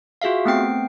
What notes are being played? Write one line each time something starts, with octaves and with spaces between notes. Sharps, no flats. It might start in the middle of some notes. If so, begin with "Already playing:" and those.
F4 F#4 G#4 E5 F5
A3 B3 C4 G5 C7